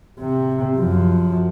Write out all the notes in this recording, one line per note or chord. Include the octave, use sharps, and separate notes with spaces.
C3
F#2 F3